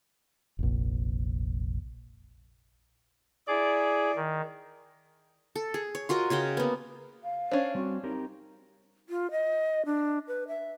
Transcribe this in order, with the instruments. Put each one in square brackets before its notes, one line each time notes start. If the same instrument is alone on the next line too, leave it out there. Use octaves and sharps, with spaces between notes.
[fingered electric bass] F1 A#1
[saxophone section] E4 D5 [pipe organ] G#4
[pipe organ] D#3
[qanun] A4
G#4
C#5
F4 F#4 A#4 D#5
C#3 C#4 F#4 G5
A#3 B3
[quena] F5
[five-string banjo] C#4 D4 [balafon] C5
[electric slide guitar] G3 C4 [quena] F#4
[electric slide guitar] C4 G4 A#4 [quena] D#4
[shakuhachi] F4
D#5
D4
B4
E5